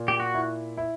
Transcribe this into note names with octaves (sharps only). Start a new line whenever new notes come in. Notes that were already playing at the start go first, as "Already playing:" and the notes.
Already playing: A#2
G4
F#4
E4
E4